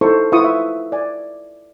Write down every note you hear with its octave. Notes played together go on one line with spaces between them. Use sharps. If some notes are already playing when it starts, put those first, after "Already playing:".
D#4 E4 A4 C5 C#6
E4 F4 B4 C#6 D#6
E5
D5 G#5